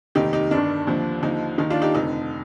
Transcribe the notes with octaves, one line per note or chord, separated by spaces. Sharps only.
F1 D#2 D#3 D#4 G4
D#4 G4
G1 G2 D#3 D4
D#2 D3 F3
D#2 D3 F3 D#4
D#2 D#3 D#4
D4 F4
D#4 G4
F1 F2 D3 D#4